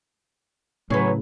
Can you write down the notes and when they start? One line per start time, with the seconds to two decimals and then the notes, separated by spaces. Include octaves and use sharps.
0.90 A2 C#3 F#3 G#4 B4 C#5